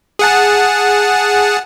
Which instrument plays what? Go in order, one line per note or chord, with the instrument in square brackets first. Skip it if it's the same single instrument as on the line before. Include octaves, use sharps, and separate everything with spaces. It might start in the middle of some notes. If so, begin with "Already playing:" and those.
[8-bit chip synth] G#4 F#5 A5